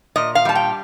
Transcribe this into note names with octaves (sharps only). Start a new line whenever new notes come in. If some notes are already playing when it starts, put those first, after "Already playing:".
A#2 D#5
F5
G3 A5
G5